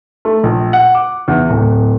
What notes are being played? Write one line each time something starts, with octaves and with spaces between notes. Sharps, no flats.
A3
A#1
F#5
D6
E2
D1